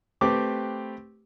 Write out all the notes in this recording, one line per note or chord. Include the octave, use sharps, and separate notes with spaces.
A3 C4 G4 B4 D6